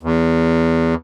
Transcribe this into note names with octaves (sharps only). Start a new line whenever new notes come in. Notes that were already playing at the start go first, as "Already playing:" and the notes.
E2